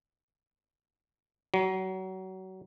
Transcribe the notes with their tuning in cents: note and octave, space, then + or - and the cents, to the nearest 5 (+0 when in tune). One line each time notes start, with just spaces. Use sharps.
F#3 +30